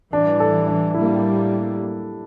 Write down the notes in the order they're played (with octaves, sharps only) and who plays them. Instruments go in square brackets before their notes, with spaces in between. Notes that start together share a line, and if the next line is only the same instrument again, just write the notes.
[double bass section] A2 E3 G3 [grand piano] D4
[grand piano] A4
D4
[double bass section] A2 G3 A#3 [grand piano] E4
[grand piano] G4